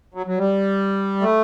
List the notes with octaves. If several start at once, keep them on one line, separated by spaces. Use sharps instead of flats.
F#3
F#3
G3
A3